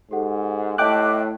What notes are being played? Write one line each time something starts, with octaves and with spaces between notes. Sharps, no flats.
G#2 G4 A4 F#5
A2 D#5 E5 G5 A5 D6 F#6